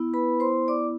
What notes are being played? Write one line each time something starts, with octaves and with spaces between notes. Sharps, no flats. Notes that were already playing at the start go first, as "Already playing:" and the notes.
Already playing: B3 E4
B4 B5
C5 C6
D5 D6